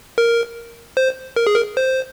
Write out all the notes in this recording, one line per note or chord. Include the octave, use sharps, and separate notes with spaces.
A#4
C5
A#4
G#4
A#4
C5